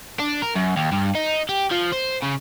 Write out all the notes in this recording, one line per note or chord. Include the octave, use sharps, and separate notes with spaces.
D4
A#4
F#2
D#2
G2
D#4
G4
F3
C5
C#3